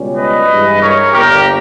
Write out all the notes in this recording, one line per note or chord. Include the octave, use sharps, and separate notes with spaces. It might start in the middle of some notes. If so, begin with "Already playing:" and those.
Already playing: C#2 B2 G3 C#4
B4 D#5
G2 E3 G#3
A#4 C#5
G1 G2 G3 A#3 G4 A#4